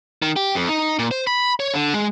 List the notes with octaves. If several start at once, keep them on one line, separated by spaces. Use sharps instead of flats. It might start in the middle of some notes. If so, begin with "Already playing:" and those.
D#3
G4
F2
D#4
A#2
C5
B5
C#5
D3
G#3